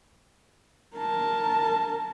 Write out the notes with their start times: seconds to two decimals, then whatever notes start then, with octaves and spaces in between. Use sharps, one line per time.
0.97 A#4 A5